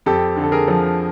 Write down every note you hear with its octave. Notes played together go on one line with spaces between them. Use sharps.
F2 G4 A4
D3
A4
G#4 A#4
F3